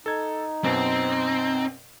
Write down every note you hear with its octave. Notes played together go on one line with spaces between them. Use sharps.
D#4 A4 G#6
F#2 B2 C4